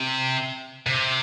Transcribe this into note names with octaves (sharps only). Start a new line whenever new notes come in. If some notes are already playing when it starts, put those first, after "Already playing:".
Already playing: C3
C3